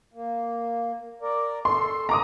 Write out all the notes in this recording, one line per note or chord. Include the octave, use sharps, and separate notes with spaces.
A#3
A#4 D5
A4 C6
A2 D#3 A#5 D6 D#6